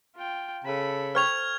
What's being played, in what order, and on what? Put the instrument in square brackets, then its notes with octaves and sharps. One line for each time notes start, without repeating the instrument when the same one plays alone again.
[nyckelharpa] F4 G5
[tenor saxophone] C#3 [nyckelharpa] A4 B5
[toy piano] C5 G5 C#6 [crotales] F6 G#6 F7